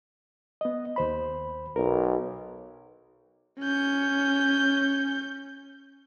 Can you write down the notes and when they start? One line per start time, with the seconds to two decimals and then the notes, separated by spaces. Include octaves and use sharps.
0.61 B3 D#5
0.96 D#2 C5 B5
1.76 B1 A#4
3.60 C#4 G6